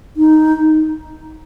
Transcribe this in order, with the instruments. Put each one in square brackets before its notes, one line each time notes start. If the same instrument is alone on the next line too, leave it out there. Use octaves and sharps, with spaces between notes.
[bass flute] D#4